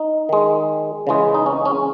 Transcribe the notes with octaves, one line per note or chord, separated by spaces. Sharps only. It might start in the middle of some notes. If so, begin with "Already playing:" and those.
Already playing: D#4
D#3 G#3
C#3 E3 G#3
D#4
C#4
C#4